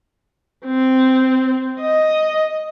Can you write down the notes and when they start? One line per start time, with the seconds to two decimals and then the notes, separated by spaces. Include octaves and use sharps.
0.66 C4
1.81 D#5